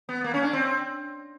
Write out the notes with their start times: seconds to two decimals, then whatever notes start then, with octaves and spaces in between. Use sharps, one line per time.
0.09 B3
0.24 A#3
0.34 C#4
0.43 D4
0.53 C4